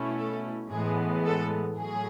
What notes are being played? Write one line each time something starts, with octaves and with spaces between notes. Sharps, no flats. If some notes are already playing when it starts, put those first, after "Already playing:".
Already playing: B2 A3 C#4 E4
A4
A2 E3 G#3 B3 G#4
A4
A2 F#3 G#4